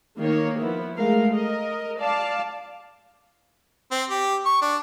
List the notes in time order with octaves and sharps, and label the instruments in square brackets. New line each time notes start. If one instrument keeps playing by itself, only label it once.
[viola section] D#3 A#3 C#5
F3 B3 E4
G#3 A3 A#4 F5
A#4 D#5
D5 F5 A5
[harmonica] C4
G4
C#6
D4